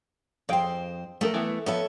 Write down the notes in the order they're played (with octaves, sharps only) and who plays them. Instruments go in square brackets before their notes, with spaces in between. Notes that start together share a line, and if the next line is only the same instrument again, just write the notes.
[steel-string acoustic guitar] F2 C5 [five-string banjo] G#4 F5 G5
[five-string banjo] F3 G#4 A#4 [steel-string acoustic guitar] A3
[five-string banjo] E3 B3
[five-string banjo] F3 B3 B5 [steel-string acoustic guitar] A4 C#5 E5